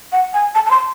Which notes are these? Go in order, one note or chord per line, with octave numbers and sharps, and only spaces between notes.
F#5
G#5
A5
A5
C6